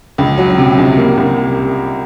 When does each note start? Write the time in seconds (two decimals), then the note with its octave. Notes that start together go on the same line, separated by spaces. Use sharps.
0.18 C#2
0.38 F#3
0.58 C3
0.77 C#2
0.97 A#3
1.17 C2